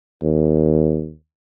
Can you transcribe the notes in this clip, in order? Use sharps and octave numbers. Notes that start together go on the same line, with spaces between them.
D#2